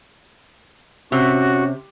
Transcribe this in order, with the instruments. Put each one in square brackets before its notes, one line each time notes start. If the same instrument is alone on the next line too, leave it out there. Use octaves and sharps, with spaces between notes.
[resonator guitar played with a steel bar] C3 [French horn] C#4 [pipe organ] F#4